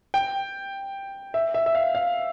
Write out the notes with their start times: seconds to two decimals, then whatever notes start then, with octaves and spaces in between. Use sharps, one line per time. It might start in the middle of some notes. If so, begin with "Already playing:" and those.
0.14 G5
1.34 E5
1.54 E5
1.66 E5
1.75 F5
1.95 F5